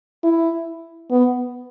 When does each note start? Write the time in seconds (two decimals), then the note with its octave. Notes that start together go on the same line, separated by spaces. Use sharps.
0.24 E4
1.11 B3